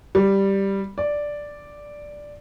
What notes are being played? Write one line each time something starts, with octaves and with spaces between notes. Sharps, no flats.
G3
D5